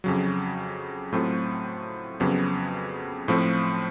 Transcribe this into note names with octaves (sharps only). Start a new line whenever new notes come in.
F2 C#3 F#3
A2 F#3 A3 C4 F4
F2 C#3 F#3 B3
A2 F3 A3 C4